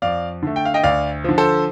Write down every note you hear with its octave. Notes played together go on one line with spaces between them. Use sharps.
F2 D5 F5
D3 A3
G5
F5
D#5 G5
D2 D5 F5
D3 F3
A4 C5